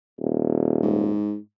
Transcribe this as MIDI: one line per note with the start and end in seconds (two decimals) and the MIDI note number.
0.20 1.12 27
0.82 1.37 44